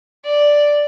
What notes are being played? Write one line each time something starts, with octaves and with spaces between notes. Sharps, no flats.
D5